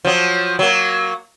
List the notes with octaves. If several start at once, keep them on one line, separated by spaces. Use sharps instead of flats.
F3 F#3
F#3 A#3